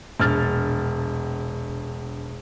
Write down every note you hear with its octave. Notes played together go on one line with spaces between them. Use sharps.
E1 A#1 F6 A6